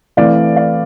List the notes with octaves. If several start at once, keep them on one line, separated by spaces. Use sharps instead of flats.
E3 A3 C4 E4 D5 F5
D5 F5